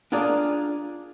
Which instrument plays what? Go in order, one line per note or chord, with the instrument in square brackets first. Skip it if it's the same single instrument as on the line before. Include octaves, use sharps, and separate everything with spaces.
[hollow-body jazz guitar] D4 F4 G#4 A#4 D5